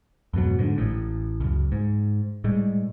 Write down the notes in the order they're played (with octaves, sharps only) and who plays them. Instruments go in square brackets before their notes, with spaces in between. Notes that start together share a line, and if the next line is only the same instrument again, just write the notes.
[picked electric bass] F2 G#2 B2 F#3
G#2 D3
A1 A2
C#2 F#2
G#2
A2 G3 G#3